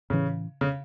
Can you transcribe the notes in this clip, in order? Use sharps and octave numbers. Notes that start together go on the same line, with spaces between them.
A2 C#3 E3 C#4
C#3